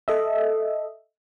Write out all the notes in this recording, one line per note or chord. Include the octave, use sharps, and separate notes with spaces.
A4 D#5 E5